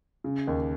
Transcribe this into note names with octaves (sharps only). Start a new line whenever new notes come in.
C#3
D#2